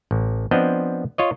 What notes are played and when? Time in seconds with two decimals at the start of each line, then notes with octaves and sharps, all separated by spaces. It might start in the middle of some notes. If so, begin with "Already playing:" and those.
0.11 A1
0.51 F3 B3 C4 D4 D#5
1.18 F4 C#5 D#5